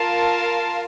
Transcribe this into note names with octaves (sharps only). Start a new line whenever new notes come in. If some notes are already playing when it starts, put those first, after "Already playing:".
Already playing: F4 A#4 F5 A5